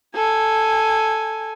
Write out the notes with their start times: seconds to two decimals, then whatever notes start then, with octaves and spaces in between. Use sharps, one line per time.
0.15 A4 G#5